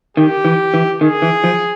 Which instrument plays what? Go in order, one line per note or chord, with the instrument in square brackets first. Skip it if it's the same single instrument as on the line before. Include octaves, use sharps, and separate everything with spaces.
[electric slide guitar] D#3 [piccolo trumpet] G4
[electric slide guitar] E3
E3
[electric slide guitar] D#3 [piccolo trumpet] G#4
[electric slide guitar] E3
F3